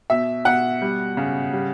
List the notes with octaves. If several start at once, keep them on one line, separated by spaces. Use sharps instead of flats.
B2 E5
B2 F#5
G3
C#3
G3